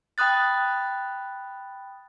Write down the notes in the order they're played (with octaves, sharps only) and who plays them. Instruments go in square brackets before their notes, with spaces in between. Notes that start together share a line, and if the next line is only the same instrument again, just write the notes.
[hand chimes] G5 B5 D#6 F#6 A6